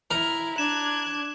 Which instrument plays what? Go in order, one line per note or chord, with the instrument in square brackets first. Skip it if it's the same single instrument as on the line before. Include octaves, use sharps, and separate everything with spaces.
[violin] E4 [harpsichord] A#4
[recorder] D4 [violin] F#6 G#6 [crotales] E7